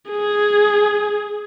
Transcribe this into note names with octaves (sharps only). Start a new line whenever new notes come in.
G#4